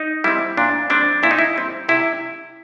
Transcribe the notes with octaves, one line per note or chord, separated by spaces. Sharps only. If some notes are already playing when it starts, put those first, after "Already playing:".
Already playing: D#4
G3 C4 E4
A#2 D4
G3 C4 D4
A#2 E4
D#4
E4
G3 C4
C3 E4